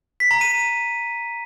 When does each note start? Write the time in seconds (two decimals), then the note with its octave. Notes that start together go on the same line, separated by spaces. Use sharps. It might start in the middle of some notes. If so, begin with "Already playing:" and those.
0.20 B6
0.31 A#5
0.41 D#7
0.52 D#7